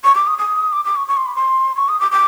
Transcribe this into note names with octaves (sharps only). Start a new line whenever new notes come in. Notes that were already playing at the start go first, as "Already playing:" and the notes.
C#6
D6
D#6
D#6
D6
D6
C#6
C#6
C6
B5
C6
C#6
D#6
D6
D6